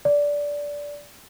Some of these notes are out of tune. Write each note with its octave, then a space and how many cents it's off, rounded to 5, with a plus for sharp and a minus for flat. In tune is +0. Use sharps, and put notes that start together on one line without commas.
D5 -15